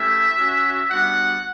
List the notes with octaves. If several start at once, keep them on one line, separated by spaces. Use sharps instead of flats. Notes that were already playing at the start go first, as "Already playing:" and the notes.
Already playing: A3 C#4 E4 G4 E5
C#4 F#4
G3 B3 D4 F#4 F#5